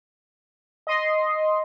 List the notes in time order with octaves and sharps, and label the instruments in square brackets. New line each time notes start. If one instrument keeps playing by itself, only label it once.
[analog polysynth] D#5 C6